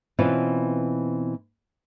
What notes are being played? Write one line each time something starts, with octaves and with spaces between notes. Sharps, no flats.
B2 E3 C4 C#4 F4 B4